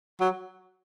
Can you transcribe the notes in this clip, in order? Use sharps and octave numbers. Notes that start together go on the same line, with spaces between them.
F#3